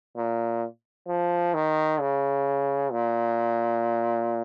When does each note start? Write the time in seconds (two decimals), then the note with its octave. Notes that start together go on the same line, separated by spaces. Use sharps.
0.16 A#2
1.08 F3
1.54 D#3
2.00 C#3
2.92 A#2